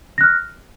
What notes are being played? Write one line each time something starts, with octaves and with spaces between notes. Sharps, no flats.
F6 F#6 A#6